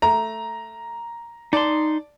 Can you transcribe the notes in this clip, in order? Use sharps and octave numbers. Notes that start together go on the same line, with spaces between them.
A3 A#5
D#4 D5 A5 C6